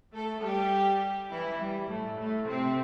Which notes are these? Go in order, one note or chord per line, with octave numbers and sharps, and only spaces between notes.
A3 A4
G3 G4
E3 E4
G3
A2 A3
A2 A3
C3 C4